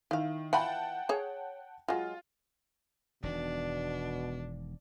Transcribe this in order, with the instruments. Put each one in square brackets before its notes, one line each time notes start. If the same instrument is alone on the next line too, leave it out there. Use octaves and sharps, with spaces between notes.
[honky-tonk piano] D#3 [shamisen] E4 F5
[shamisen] E3 F4 B5 [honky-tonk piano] F#5 G5 A5
[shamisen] G#4 C#5
[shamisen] F#3 G#3 [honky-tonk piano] F4
[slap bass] E1 D#3 [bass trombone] B2 [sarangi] D4